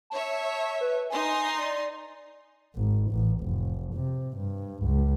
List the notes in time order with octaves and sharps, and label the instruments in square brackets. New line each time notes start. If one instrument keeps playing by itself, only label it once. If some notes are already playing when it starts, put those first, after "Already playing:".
[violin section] C#5 E5 [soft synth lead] A5
[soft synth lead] B4
[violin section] D#4 C6 [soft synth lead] G#5
[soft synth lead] D5
[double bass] G#1
A1
F1
C3
G2
C#2